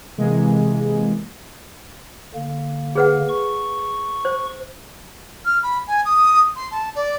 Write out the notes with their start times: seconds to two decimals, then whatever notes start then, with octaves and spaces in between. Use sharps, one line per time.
0.18 C3 E3 G#3 A#3
2.35 D3 A#3
2.95 G#4 B4 F#5
3.29 C#6
4.25 C5
5.45 F6
5.63 B5
5.87 G#5
6.05 D#6
6.56 C6
6.71 A5
6.96 D5